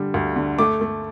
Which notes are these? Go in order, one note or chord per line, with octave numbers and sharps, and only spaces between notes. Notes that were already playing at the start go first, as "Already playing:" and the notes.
Already playing: D3 G3
D2
D3
A3 D6
A3